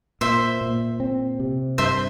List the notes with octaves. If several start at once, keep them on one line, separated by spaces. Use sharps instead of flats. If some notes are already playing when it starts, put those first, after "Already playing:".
A#2 C5 E5
A#2
C4
C3
G2 C5 E5